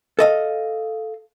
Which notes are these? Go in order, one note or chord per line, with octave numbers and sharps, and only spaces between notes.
A4 D#5 F5